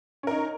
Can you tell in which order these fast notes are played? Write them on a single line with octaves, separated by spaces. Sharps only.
C#4 A#4 D#4